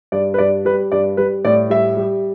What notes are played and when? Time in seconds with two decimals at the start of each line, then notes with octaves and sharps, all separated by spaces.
0.12 G2 D5
0.34 B4
0.38 G2 D5
0.65 G3 B4
0.92 G2 D5
1.17 G3 B4
1.45 A2 D5
1.70 G3 E5
1.97 G3